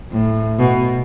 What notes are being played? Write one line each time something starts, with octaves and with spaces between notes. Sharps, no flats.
A2
B2